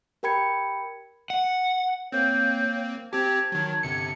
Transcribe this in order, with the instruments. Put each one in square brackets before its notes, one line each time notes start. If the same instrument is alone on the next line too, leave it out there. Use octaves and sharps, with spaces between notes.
[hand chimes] G4 A#4 G5 B5 G#6 C#7
[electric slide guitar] F#5
[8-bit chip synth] A#3 C4 [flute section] C#5 G6
[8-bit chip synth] C4 G4 [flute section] A5 G#6
[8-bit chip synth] D#3 F#3
G1 C3 C#7